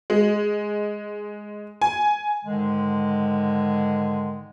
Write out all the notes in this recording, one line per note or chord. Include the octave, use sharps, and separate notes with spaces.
G#3
G#5
G#2 D3 D#3 G#3